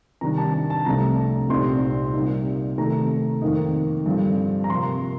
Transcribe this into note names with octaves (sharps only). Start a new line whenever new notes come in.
C3 D#3 G3 D4 A#5
A5
A5
A5
C2 C3 F3 A3 D4 A#5
C2 A#2 G3 C4 D#4 C6
C3 G3 A#3 D#4
C3 D#3 A3 A#5
F2 D#3 A#3 D#4
G2 D3 F3 C4
A#5
C3 F3 A#3 C6